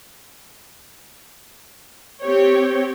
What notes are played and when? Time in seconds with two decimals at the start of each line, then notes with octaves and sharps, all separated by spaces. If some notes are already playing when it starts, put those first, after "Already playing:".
2.21 C4 G4 C#5 G5